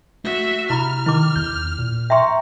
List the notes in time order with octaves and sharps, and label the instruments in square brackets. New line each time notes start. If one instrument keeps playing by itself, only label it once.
[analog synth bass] A3 [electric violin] F#4 E5
[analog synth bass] C3 [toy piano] E4 A#5 B5 [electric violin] F6
[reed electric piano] D#3 [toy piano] E4 D6
[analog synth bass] E2 [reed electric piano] G6
[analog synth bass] A#2
[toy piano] E5 C6 [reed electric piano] G5 A#5 C#6